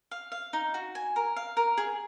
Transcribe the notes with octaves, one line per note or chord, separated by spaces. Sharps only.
F5
F5
D#4
F#4
G#5
A#4
F5
A#4
G#4